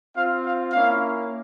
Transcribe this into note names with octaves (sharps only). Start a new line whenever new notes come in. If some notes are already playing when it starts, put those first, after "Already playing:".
C4 F4 F5
F5
A#3 C#4 E4 F5